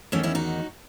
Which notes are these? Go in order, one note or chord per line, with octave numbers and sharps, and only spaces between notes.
E2 D#3 A3 C#4
C#4 E4
D#4 F#4